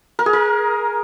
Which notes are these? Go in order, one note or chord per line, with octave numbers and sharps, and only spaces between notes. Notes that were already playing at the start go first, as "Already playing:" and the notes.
A#4
G#4
A#4